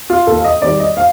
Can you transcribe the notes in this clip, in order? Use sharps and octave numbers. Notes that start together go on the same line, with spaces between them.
F4
D#2 A4
F5
D#5
D#3 G3 D5
D#5
F5